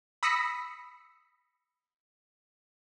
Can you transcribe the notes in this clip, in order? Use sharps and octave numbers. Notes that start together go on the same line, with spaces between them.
B5 D#6 E6 A#6 B6 C#7